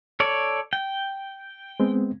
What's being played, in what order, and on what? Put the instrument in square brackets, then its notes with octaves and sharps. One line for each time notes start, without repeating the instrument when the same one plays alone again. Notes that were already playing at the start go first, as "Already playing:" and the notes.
[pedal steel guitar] A4 C#5 D5
G5
[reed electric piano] G#3 B3 C4